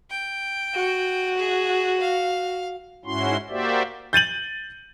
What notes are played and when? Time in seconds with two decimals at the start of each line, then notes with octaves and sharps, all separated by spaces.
0.10 G5
0.75 F#4
1.38 G#4
2.01 F5
3.05 G#2 C#4 E4 F#4 C6
3.50 A#3 F#4 G4 C5 D5 E5
4.13 G6 A6 D#7 F#7